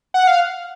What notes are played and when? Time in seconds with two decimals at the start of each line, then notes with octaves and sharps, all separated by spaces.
0.14 F#5
0.27 F5